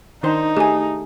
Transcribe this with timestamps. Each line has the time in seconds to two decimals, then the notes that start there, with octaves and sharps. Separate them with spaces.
0.23 D#3 D4 D#4 C5
0.57 A3 G4 G#4 G#5